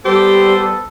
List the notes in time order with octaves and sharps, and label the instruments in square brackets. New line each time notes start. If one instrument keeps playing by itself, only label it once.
[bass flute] G3 [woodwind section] B3 A4 [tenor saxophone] G4 [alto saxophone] C5